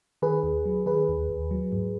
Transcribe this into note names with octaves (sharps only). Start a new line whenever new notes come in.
D#3 G#4 B4
D#2
F#3
D#3 G#4 B4
D#2
D#2
F#3
G#2